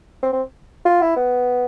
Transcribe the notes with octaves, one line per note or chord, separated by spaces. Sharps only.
C4
C4
F4
E4
B3